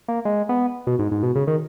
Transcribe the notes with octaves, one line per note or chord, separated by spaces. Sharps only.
A#3
G#3
B3
B2
G#2
G#2
B2
C#3
D#3